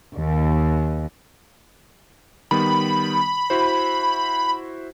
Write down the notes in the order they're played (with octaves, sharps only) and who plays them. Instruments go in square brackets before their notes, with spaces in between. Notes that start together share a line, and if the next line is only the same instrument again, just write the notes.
[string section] D#2
[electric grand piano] D#3 G3 B3 [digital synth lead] B5
[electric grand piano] E4 F#4 C5